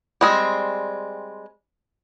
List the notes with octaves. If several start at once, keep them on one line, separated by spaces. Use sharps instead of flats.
G3 G#3 C4